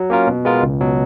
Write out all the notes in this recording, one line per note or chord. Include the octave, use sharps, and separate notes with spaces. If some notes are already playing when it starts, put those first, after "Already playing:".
Already playing: F#3
A#3 C#4 F4 A#4
B2
G#3 B3 F4 A#4
C#2
B2 F#3